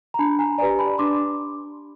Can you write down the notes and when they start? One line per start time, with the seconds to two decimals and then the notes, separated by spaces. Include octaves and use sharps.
0.14 A#5
0.19 D4 A5 B5
0.39 G#5 A#5
0.58 G4 B4 D5 G#5 A#5
0.79 A5 B5
0.98 D4 C6 D6